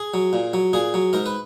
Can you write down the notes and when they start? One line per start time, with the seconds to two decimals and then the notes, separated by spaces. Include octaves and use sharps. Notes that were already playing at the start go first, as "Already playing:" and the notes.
Already playing: G#4
0.14 F#3
0.33 A#2
0.54 F#3
0.73 A#2 G#4
0.94 F#3
1.13 G#2 A#4
1.26 B4